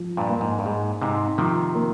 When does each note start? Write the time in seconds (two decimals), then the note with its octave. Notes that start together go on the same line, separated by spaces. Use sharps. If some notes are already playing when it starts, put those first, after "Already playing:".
Already playing: F3
0.17 G2 A#2
0.29 A#3
0.41 G#2
0.59 G2
0.66 G#2 G#4
1.02 G#2 C3 D#4
1.38 C3 D#3 F3
1.75 A#3